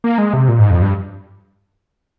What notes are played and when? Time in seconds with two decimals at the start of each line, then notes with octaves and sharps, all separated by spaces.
0.04 A#3
0.18 G#3
0.33 C3
0.48 A#2
0.59 G#2
0.70 F2
0.82 G2